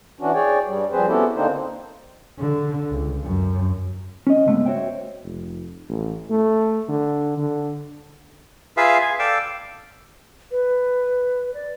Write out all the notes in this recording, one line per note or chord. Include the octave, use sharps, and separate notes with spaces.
E3 C#4 D4 F#4
G#4 C#5 D5 G5
G2 G3
F3 G3 C4 G#4 B4 C5
B3 C#4 E4 F#4 G4 A4
D3 A#3 C4 D4 D#4 C5
D3
C#2
F#2
C#4 D#5
C#2 G#2 G#3 A3 B3
F#4 C5 C#5 E5 G5
F1
A1
A3
D3
D3
F4 G#4 B4 E5 F5
G#5
A4 D5 F5 G5 E6
B4
D5